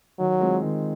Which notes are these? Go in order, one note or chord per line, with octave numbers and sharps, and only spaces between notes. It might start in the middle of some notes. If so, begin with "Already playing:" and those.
D#3 F#3
G#3 C4 F4
D#3